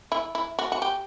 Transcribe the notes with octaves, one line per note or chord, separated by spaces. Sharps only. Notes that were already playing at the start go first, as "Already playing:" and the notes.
E4
E4
F#4
F#4
G4